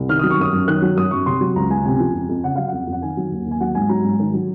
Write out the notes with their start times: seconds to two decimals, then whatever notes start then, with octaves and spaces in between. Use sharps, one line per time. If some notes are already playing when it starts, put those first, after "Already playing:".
Already playing: C2
0.09 D#3 F6
0.19 F#3 D#6
0.30 C#6
0.38 F#2 D#6
0.53 F#2
0.68 D#3 F#6
0.82 F#3
0.97 F#2 D#6
1.11 F#2 C#6
1.26 C3 C6
1.41 F#3
1.55 C#2 A#5
1.70 C#2 G#5
1.85 C3 G#5
1.99 F3
2.14 F2
2.29 F2
2.44 C#3 F#5
2.56 F#3 F5
2.68 F2 F#5
2.87 F2
2.92 F#5
3.02 D#3 G#5
3.17 F#3
3.32 D#2
3.46 D#2
3.51 G#5
3.60 F#3 F#5
3.75 G#2 G#5
3.89 F#3 A#5
4.04 G#2
4.20 D#3
4.34 F#3